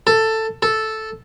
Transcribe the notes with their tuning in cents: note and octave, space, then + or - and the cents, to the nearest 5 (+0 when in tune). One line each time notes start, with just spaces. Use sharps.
A4 +10
A4 -5